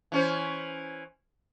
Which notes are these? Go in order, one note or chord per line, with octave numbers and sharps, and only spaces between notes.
E3 C#4 C5